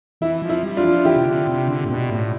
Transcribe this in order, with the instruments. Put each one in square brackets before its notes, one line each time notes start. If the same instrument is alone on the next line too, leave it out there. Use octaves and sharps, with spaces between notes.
[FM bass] E3 [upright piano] E4
[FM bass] F3
[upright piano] E4
[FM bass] G3
[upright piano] D4 F4
[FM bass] F3
[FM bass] E3 [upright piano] E4 G4
[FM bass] C3
D3
C3
D3
A2
B2
A2